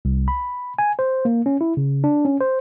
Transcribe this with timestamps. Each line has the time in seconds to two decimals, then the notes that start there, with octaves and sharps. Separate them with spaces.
0.05 C2
0.28 B5
0.79 G#5
0.99 C5
1.25 A#3
1.46 C#4
1.61 E4
1.77 C#3
2.04 D4
2.25 C#4
2.41 C5